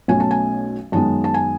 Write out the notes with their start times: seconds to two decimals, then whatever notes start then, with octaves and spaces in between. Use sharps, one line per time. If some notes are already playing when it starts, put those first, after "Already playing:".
0.08 B1 B2 A3 C#4 G#5
0.20 A5
0.31 G#5
0.92 F#2 D#3 G#3 B3 A5
1.24 A5
1.34 G#5